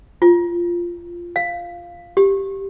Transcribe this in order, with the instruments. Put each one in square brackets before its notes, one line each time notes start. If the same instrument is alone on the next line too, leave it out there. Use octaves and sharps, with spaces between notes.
[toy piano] F4
F5
G4